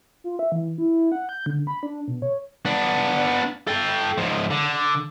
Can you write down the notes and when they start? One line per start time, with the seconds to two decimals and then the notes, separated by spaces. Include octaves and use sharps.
0.24 F4
0.39 E5
0.52 E3
0.78 E4
1.12 F#5
1.29 G6
1.46 D3
1.67 B5
1.83 D4
2.08 B2
2.22 C#5
2.66 B3 D4
3.68 A4 G5
4.18 G#2 F3
4.50 D3